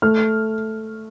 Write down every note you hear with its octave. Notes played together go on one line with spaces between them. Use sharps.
A3 F6